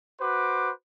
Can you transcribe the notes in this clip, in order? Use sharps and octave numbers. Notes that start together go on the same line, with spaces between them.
F#4 B4 C5 D6